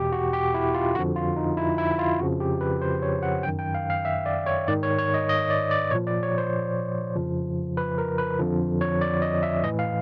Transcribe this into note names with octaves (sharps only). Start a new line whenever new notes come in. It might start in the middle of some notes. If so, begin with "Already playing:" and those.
Already playing: E2 B2 G4
F#4
G4
E4
F4
F2 D3 F3 F#4
F4
D#4
E4
E4
F4
F2 C#3 F3 F#4
G4
B4
C5
C#5
F#5
F#2 D#3 G5
G5
F5
F5
E5
D5
C#5
G#2 D#3 D5
C#5
C#5
D#5
D#5
D5
D5
A#2 F3 C#5
D5
C#5
C5
F2 C#3 F3
B4
A#4
B4
F2 D3 F3
C#5
D5
D#5
E5
A2 E3 D#5
F5